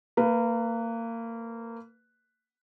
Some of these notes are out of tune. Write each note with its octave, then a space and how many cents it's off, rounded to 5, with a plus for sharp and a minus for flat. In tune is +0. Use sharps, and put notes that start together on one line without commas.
A#3 -25 B4 +0